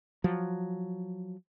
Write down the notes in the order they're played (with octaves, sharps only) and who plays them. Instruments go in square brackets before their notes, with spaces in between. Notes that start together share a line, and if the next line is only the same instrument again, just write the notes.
[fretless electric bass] F3 F#3